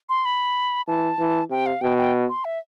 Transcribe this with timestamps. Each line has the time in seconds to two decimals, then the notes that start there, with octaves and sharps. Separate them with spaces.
0.09 C6
0.25 B5
0.88 E3 A5
1.19 E3
1.50 C3 G5
1.66 F5
1.81 B2 G5
1.98 G5
2.29 C6
2.45 E5